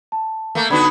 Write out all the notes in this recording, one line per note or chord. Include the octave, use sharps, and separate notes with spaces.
A5
A3 A#3
D3 B3 D#4 F#4 B5 G#6